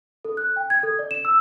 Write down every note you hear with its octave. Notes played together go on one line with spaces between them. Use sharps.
A4
F#6
G5
G#6
A4
D5
E7
E6